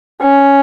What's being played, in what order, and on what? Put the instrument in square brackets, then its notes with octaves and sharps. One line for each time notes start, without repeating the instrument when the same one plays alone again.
[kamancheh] C#4